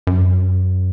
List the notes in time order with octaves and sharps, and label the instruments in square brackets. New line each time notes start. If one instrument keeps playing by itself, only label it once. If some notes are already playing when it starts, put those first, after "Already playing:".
[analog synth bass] F#2